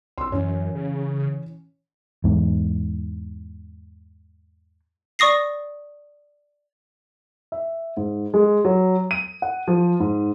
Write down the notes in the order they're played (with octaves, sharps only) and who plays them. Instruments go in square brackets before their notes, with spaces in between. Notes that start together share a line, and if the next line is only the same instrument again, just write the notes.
[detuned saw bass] C2 [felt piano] C6 E6
[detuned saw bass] F#2 [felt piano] E3 C#4
[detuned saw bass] C#3
[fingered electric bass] E2 G#2
[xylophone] D5 C#6 D#6 A#6 C7
[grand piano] E5
G#2
G#3
F#3
D#7
F#5
F3
G#2